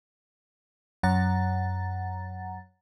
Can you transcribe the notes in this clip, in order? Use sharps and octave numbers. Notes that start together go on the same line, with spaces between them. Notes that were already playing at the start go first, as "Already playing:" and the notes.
F#2 F#5 A#5 A6